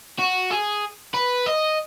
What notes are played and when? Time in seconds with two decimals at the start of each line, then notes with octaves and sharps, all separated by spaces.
0.19 F#4
0.51 G#4
1.14 B4
1.46 D#5